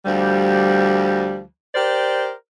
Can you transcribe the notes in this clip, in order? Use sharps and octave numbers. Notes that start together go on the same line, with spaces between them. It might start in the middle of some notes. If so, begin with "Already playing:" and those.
D2 F3 G3
G4 A#4 C5 D5